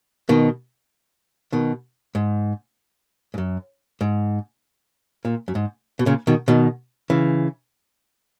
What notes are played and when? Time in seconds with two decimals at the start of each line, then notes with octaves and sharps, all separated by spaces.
0.29 B2 D#3
1.53 B2 D#3
2.15 G#2
3.34 G#2
3.38 F#2
4.01 G#2
5.25 A#2
5.48 F#2
5.55 G#2
5.99 B2
6.06 A#2 C#3
6.27 B2 D#3
6.48 B2 D#3
7.10 C#3 E3